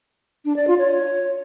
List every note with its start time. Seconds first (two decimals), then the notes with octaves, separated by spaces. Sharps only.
0.45 D4
0.56 D5
0.67 F4
0.79 C#5